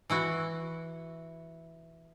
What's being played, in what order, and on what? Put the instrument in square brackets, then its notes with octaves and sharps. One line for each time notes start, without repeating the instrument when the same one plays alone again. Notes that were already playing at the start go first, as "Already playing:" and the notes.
[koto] E3 E4 F#4